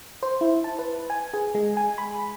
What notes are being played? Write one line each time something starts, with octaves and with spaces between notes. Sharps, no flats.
C5
E4
A5
B4
G#5
G#4
G#3
G#5
B5